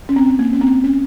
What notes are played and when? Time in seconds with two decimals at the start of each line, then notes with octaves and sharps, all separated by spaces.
0.09 C#4
0.16 C4
0.39 A#3
0.53 C#4
0.61 C4
0.84 C#4